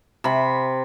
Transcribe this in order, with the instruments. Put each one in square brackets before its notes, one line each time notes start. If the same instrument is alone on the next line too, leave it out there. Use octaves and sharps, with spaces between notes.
[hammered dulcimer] C3 B5